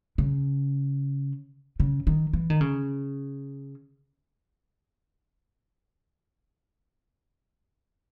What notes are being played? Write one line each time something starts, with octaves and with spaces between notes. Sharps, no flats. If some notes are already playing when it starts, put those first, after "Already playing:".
C#3
C#3
D#3
E3
D#3
C#3